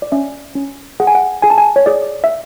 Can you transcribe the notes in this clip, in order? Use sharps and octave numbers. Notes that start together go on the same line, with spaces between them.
D5
C#4 E5
C#4
G#4 F#5
G#5
F#5
G#4 G#5
A5
G#5
C#5
G#4 D5
E5